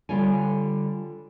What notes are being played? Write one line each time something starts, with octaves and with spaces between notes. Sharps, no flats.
D3 G3 F4 C#5 G#5